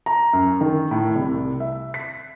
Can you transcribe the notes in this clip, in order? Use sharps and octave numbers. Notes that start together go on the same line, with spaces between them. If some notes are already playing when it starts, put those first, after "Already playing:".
A#5
F#2
D#3
A2
C2
E5
B6